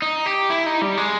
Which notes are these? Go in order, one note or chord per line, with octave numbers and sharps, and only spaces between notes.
D#4
G4
E4
D#4
G3
G#3